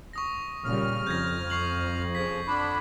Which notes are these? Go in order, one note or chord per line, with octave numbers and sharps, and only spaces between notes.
C#6 D#6 A#6
A#2 C#3 G3 F6
F2 G6 G#6 A#6
C#6 C7 F#7
C#3 F3 G#6 B6
D3 D4 B5